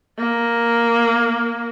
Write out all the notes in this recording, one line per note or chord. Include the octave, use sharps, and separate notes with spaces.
A#3